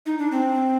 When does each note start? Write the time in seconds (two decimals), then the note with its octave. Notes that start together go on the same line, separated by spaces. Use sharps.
0.06 D#4
0.19 D4
0.32 C4